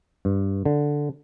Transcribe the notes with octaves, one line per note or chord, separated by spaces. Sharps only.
G2
D3